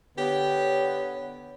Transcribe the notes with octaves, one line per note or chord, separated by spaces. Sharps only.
D3 B3 G4 C#5